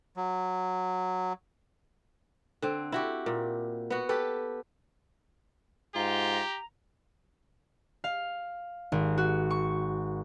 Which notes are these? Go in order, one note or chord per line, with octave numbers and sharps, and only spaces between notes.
F#3
D3 C4
E4 F#4 G4
A#2
B3 F#4
G4 A4 B4
G#2 F4 G4 A#5
F5
G#1
F#4
C#6